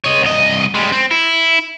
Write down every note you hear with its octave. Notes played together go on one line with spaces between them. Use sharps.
C#5 D#5
C2 D#5
G3 G#3
C4
E4